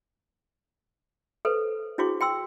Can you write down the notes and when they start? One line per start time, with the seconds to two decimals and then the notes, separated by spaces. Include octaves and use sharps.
1.45 A4 B4 C5
1.98 D4 E4 F#4 G#4 C5 C#6
2.21 G5 C6 E6